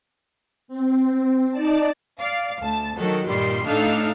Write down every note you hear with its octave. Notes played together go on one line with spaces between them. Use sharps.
C4
D#4 D5 A5
D5 F5
D2 A5
D#3 F#3 F#4 A4
G2 A#2 D#3 G3 C6 C7
A2 D4 D#4 A4 F5 F6